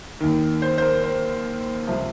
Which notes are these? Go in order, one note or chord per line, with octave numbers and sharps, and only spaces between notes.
D#2 D#3
C5
C5
A#4
C5
C#2 C3 F3